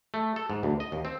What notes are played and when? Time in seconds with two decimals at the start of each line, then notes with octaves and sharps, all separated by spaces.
0.14 A3
0.36 A4
0.50 G#2
0.63 D2
0.80 D#5
0.92 D#2
1.05 C4